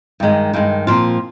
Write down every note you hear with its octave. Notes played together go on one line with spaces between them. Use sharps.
G2 D#3 G#3
G2 D#3 G#3
A#2 F3 C4 F4